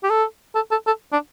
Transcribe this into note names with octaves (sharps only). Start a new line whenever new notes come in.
G4
A4
A4
A4
A4
D4